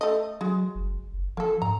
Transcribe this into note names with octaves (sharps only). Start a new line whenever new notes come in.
A3 D#5
F#3 G#3 F#4
F#1
F#1
F3 A#3 A4
G#2 A#5